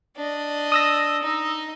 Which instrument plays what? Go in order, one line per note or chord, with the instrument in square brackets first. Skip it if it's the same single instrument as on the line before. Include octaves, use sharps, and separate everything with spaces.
[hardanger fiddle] D4 D#5
[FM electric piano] D#6 E6 A#6
[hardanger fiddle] D#4 D#5